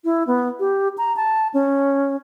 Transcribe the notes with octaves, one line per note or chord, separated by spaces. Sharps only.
E4
B3
G4
A#5
A5
C#4